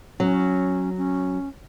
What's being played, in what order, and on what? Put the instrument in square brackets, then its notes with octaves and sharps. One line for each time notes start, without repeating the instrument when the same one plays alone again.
[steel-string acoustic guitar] F#3 [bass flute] C#4
[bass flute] C#4